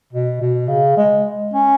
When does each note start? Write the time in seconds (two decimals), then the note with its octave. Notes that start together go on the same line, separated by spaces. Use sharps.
0.13 B2
0.41 B2
0.68 C#3
0.97 G#3
1.53 C#4